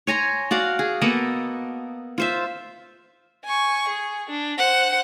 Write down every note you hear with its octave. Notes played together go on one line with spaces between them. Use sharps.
C#5 G#5 A#5 C6
F#4 D5 F5
G#4
A#3 B3 A4 D#5
F4 C5 E5
G#5 C#6
G#4
D4
C5 F#5